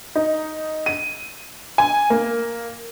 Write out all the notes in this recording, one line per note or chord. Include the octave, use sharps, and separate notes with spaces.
D#4
D#7
G#5
A#3